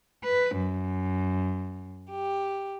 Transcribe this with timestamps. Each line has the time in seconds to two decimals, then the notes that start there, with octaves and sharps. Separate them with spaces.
0.24 B4
0.56 F#2
2.11 G4